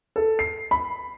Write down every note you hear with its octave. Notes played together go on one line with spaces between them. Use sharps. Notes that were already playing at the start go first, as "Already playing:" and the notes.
A4
C7
B5